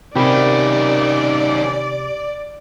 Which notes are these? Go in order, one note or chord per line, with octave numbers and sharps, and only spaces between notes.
C3 D#3 C#4 G4 D5 B5